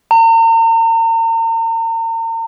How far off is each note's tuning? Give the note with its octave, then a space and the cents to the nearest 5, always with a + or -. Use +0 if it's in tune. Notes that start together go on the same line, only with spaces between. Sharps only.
A#5 -40